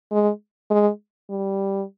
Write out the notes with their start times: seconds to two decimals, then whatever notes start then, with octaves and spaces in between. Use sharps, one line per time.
0.12 G#3
0.71 G#3
1.30 G3